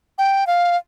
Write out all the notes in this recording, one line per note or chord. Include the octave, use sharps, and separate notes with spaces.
G5
F5